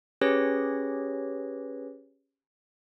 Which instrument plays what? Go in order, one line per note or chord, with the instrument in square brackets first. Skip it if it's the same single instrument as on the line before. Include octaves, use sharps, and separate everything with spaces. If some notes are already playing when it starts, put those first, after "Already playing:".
[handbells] C#4 G4 G#4 B4 C#5 A#6